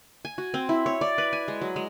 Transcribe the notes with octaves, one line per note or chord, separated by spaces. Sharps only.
G#5
F#4
C4
E4
C#5
D5
B4
G#5
G#3
F#3
G#3